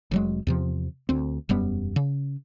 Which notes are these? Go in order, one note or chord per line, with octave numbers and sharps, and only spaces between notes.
F1 F#3 G#3
E2 C3 F3
D2 C4
E1 F#2 G3 B3
C#3